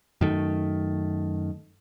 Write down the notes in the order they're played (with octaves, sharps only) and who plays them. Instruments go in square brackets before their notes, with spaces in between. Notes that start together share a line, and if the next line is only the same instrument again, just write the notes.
[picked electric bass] F#2 D#3 A3